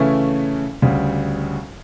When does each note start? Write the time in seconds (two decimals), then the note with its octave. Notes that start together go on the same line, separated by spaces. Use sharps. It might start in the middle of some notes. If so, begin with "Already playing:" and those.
Already playing: C#3 E3 A3 C#4 E4
0.82 D2 C#3 G3